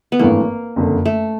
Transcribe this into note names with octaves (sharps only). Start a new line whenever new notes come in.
B3
G#1 G2 E3 A3 A#3
F#1 F2 D3
A3